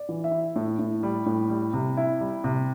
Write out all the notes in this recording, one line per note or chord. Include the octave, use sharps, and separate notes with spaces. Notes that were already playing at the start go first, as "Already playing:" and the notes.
Already playing: D5
E3
E5
E4
A2
A2
G3
A2
G3
C3
E4
G3
C3